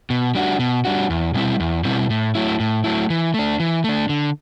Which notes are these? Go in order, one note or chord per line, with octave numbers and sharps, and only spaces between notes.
B2
G3 D4 F#4
B2
G3 D4 F#4
E2
B2 G3 C4 E4
E2
B2 G3 C4 E4
A2
F#3 A3 E4
A2
F#3 A3 E4
E3
A3 D4
E3
A3 D4
D3